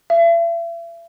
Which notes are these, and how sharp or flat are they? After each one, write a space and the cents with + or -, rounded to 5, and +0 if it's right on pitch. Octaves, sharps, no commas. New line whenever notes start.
E5 +40